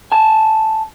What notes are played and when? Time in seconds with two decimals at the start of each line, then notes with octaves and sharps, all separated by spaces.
0.12 G#5 A5